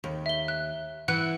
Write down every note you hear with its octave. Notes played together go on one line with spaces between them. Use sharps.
D#2
E5 G7
F#6
E3 F#5 F#6